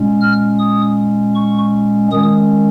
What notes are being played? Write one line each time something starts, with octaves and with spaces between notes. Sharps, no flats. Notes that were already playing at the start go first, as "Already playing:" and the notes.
Already playing: A#2 G#3 C#4
F6
D#6
C#6
D#3 G#3 C#4 D#6